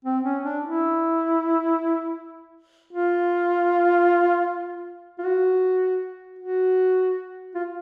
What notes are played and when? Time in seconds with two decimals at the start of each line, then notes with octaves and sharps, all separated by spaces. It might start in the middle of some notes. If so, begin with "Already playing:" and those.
0.05 C4
0.24 C#4
0.44 D4
0.63 E4
2.93 F4
5.19 F4
5.24 F#4
6.39 F#4
7.55 F4